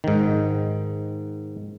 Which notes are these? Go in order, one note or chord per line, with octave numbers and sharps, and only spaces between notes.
G#2 D#3